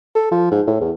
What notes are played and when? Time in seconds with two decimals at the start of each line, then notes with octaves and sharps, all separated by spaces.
0.15 A4
0.32 F3
0.51 G#2
0.67 A2
0.81 E2